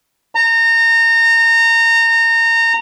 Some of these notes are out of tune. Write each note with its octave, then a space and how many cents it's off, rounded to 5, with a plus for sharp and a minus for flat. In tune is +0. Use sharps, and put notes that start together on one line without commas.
A#5 -25